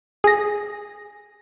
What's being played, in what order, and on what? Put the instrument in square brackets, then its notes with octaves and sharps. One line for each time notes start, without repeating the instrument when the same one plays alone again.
[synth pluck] G#4 A#6